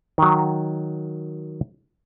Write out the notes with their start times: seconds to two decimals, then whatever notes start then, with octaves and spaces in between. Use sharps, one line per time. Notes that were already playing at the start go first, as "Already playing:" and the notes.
0.18 D#3 F#3